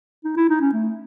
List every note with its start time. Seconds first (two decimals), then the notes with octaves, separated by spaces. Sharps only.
0.25 D#4
0.37 E4
0.49 D#4
0.61 C#4
0.73 A3